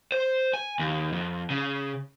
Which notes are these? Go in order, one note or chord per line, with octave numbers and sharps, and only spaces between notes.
C5
G#5
D#2
F2
C#3